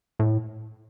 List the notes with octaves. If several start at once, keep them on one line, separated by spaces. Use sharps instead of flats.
A2